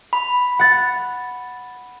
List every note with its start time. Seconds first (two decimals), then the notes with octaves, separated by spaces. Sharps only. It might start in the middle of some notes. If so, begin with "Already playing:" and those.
0.13 B5
0.59 F#5 A6